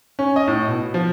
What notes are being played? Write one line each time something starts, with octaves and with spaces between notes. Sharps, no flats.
C#4
D#5
A2
B2
F3